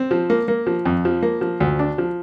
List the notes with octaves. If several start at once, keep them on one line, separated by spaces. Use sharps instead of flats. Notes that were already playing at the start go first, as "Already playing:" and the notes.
Already playing: C4
F3
A#3
A#3
F3
F2
F3
A#3
F3
D2
D4
F3